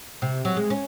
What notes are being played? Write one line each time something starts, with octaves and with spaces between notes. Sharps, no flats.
C3
F#3
G#3
C#4